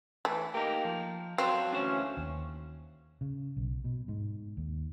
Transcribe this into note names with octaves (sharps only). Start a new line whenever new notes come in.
E3 A3
A#3 D#4 G4
F3
F#3 C4 A4 F5
D2 E3 C#4 D4 C5
D#2
C#3
B1
B2
G#2
D#2